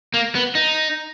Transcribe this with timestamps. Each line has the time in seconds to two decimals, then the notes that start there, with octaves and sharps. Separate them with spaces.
0.14 A#3
0.35 B3
0.55 D#4